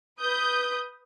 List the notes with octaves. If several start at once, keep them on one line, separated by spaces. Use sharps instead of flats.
B4 D#6 G6